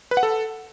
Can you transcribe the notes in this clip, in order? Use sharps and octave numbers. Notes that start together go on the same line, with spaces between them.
B4
F#5
A4